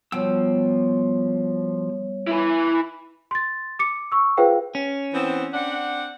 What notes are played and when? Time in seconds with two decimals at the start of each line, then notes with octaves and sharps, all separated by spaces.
0.12 B2 F3 G3 C#5 G5 E6
2.27 E4 B4
3.31 C6 A6
3.79 D6 C#7
4.12 C#6 E6
4.37 F4 G#4 B4 C5 F5 G5
4.75 C#4
5.14 E3 B3 C4
5.53 C4 D4 F#5